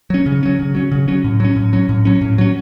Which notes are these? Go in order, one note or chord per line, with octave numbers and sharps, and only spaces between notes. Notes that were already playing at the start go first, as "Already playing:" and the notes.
F#3 C#4
C#3
F#3 C#4
C#3
F#3 C#4
C#3
F#3 C#4
A2
F#3 C#4
A2
F#3 C#4
A2
F#3 C#4
A2
F#3 C#4